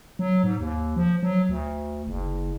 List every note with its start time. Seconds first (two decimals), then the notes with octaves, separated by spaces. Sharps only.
0.19 F#3
0.43 G#2
0.60 D#2
0.96 F3
1.23 F#3
1.49 D2
2.07 F#1